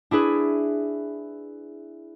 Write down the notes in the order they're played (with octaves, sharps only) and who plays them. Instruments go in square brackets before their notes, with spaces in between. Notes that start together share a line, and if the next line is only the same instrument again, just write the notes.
[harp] D4 E4 G#4 B4